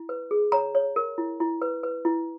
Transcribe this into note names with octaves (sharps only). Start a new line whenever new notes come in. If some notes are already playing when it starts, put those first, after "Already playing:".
Already playing: E4
B4
G#4
C#5 A#5
C#5
A#4
E4
E4
B4
B4
E4